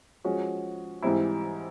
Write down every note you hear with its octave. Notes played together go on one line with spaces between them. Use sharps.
F3 G#3 C#4 F#4
G#2 E3 G3 C4 E4